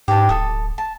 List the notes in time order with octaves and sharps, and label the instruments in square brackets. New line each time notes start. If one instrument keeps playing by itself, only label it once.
[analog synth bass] G#2 [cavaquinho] G4 A5
[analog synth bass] D1 [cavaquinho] A4 D#6
[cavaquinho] A5